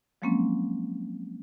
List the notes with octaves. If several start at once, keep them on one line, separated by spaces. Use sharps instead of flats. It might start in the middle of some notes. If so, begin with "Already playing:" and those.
F3 F#3 G#3 A#3 C4 C#4